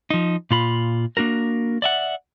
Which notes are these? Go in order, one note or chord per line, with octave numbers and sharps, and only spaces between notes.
F3 D#4
A#2 F4 B5
A#3 D4 F#4 A#4
D5 E5 F#5